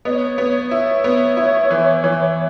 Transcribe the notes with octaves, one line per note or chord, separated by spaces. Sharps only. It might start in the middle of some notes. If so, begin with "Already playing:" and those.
B3 C#5 D#5
B3
E4 C#5
B3
E4
E3
E3